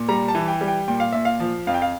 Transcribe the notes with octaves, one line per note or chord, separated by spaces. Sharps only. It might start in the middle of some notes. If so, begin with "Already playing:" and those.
Already playing: A#2
G3 A#5
A5
E3
G5
G3
G5
A#2 G5
F5
A#2 E5
F5
F3
F2 F5
G5
F5